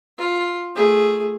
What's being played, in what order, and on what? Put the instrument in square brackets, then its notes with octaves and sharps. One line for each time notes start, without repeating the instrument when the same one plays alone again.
[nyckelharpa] F4
A3 G#4